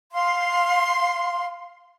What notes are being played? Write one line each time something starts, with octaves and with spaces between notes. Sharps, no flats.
F5 C6